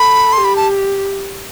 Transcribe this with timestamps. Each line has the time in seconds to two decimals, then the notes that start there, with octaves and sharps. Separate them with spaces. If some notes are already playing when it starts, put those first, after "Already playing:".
Already playing: A4 B5
0.33 G4 C6
0.45 B5
0.56 A5